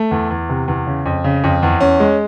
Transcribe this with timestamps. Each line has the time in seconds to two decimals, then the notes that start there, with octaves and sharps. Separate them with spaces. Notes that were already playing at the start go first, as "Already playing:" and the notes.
Already playing: A3
0.11 E2
0.30 E2
0.49 C3
0.68 E2
0.87 C#3
1.06 F2
1.24 C#3
1.44 F2
1.63 E2
1.80 C#4
2.00 G#3